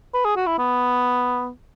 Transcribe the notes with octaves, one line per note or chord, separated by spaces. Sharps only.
B4
G#4
F#4
E4
B3